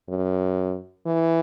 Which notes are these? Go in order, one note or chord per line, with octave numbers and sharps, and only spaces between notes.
F#2
E3